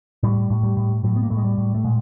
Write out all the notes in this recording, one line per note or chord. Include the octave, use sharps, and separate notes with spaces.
A2 G3
A2
G3
A2
A2 F#3
B3
A#3
A2 A3
G#3
G3
A2
A3
A#2 G#3